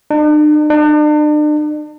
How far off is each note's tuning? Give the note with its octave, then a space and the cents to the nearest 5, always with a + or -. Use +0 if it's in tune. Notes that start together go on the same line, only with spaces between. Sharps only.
D4 +45
D4 +40